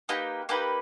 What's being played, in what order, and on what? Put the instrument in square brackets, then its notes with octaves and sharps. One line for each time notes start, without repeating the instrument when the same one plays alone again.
[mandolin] A#3 D#4 G4 B4
A#3 D#4 G4 B4